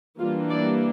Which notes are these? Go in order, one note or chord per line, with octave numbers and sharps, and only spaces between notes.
E3 G3 A#3 D4 F4
D5